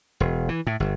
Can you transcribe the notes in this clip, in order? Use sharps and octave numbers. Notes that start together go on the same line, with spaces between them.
E1
E3
A2
G1